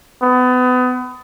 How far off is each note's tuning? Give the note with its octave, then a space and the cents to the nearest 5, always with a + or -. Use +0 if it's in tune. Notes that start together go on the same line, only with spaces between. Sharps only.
B3 +30